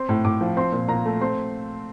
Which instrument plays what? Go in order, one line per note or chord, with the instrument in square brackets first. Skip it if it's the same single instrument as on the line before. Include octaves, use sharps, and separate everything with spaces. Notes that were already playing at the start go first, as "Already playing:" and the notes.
Already playing: [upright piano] C4 C6
A2
A2 D6
F3
C4 C6
A#2
A#2 A#5
A3
C4 C6